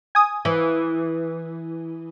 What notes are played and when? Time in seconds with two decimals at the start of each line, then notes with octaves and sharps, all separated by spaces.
0.15 G#5 D#6
0.45 E3